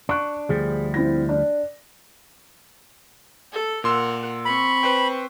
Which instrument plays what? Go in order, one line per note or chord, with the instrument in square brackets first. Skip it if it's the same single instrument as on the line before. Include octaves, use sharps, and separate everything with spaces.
[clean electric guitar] D4 [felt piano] C#6 F#6
[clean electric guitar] D2 F3 G3 [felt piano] G#4
[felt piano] C4 E4 A#6
D4
[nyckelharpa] A4
[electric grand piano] A#2 C6 E6 [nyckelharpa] A#4 F#5
[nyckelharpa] C4 C#6 [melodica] B5
[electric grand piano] B4 C5 G5